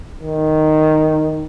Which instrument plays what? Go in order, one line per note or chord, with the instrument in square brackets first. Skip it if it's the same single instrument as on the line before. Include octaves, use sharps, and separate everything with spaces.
[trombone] D#3